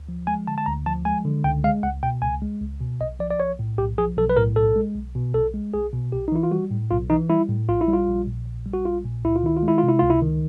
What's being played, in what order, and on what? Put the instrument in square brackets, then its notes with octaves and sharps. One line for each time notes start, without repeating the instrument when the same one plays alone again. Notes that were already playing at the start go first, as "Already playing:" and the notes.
Already playing: [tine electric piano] D2
F3
G#3 G#5
D3 A5
A5
D2 A#5
F3 A5
G#3 G#5
D3
C#2 G5
G#3 F5
C#2 F#5
B2 G5
C#2 G#5
G#3
C#2
B2
B1 D#5
F3 D5
D5
B1 C#5
A2
B1 G4
F3 G#4
B1 A4
B4
A2 A#4
B1 A4
G#3
B1
B2
B1 A4
G#3
B1 G#4
B2
B1 G4
D#4
E3 E4
F4
G3 F#4
A2
B1 F4
E3 D#4
G3 E4
A2
A#1 F4
E4
G3
F4
A#1
A#2
A#1
G3
F#4
A#1 F4
A#2
C#2 E4
F4
D#3 E4
F4
G#3 E4
F4
C3
E4
C#2 F4
E4
D#3